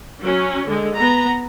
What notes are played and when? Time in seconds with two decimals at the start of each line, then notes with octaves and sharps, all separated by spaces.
0.22 F#3 C#4
0.67 D3 G#3
0.96 B3 A#5